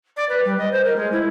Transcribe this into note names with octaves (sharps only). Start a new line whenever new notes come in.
D5
B4
G3
D#5
C5
A#4
G#3
E4